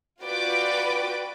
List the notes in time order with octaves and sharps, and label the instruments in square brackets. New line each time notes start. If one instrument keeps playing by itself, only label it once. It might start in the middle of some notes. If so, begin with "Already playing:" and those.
[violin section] F4 F#4 B4 D5 G5 D6